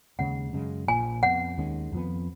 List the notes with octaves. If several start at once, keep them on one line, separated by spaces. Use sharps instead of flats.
D#2 C#3 G#3 C#4 F#5
F#2 C#3 G#3
A#1 A#2 F3 G#5
F2 F3 B3 F#5
D#2 D#3 G#3 C#4
F2 F3 B3